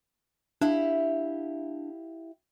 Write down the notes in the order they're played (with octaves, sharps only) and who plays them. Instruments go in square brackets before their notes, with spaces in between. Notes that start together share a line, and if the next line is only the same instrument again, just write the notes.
[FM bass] D4 [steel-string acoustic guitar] E4 G4 F5